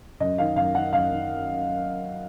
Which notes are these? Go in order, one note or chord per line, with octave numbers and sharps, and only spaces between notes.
F#2 D#5
D#3 F5
F#2 F5
D#3 F#5
F#2 F5
D#3